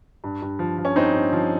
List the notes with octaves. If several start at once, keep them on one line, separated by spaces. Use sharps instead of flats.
G2
G2
F3
F3
C#4
G2 C4 D#4
G2
F3